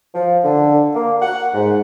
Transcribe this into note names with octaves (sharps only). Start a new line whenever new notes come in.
F3
D3
A#3
F#5
G#2